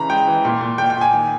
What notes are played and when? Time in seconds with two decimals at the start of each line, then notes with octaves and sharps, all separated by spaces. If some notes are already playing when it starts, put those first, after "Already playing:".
Already playing: C#3 E3 A#5 B5
0.09 G#3 G5
0.27 E3
0.45 A#2
0.61 A#2
0.78 A#2 G5
0.90 G5
0.97 A#2 G#5
1.13 D#3